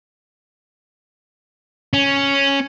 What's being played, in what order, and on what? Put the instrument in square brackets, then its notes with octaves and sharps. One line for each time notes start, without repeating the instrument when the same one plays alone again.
[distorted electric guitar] C#4